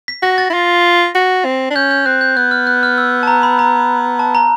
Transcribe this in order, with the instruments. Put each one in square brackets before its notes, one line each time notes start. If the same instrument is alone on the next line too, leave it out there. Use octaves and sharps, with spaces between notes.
[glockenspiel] B6
[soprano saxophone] F#4 [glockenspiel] A#6
[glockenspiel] A6
[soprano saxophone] E4
F4
F#4
C4
D4
[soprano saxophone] C#4 [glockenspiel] G6
[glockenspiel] G6
[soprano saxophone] C4 [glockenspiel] F#6
[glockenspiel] G6
[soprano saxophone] B3 [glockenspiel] F#6
[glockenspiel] F6
F#6
F6
E6
A5
A#5
B5
A#5
A5
A#5